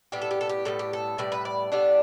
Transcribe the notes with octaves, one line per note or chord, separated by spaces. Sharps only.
A2 G3 B3 G4
A4
G4
A4
G4
A2 G3 B3 A4
G4
A4
A2 G3 B3 D5
B4
D5
A2 G3 B3 D4